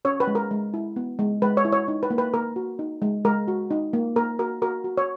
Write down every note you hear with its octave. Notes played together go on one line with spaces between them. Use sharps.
C#4 C#5
B4
G#3
A#4
G#3
E4
B3
G#3
G#3 B4
C#5
E4
C#5
D#4
B4
A#3
B4
A#3 A#4
F#4
D#4
G#3
G#3 A#4
F#4
D#4
A#3
A#3 A#4
F#4 A#4
F#4 A#4
F#4
C#5